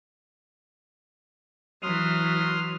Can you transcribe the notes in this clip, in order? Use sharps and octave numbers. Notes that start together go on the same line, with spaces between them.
E3 F#3 C6 D#6 F6